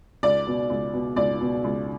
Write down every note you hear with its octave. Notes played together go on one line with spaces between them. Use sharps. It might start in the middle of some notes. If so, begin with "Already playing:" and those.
C#2 D5
B2
C#2
B2
C#2 D5
B2
C#2